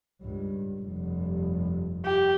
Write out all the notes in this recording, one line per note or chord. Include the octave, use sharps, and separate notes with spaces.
C#2 G2
F1 G2
G4